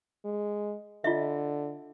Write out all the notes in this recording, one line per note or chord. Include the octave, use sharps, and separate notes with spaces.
G#3
D3 F4 D#5 E5